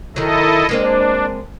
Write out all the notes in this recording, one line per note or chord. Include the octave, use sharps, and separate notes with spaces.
D#3 F#3 E4 A4 D#5
G#3 A#3 C4 D4